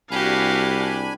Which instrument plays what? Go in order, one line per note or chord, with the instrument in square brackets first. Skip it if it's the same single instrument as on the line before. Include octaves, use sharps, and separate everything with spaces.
[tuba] C2 [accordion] D4 G#5 B5 [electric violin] F#4 F5 [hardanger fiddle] G4